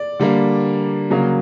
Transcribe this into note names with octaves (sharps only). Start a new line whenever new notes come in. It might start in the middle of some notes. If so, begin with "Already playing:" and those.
Already playing: D5
D3 G3 A#3
C#3 F#3 A#3